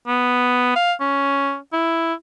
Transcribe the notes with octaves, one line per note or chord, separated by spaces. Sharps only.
B3
F5
C#4
E4